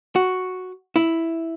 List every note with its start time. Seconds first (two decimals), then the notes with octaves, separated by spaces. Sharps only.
0.16 F#4
0.96 E4